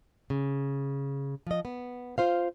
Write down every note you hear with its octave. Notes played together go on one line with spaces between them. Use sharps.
C#3
F3 D#5
B3
F4 C5 F5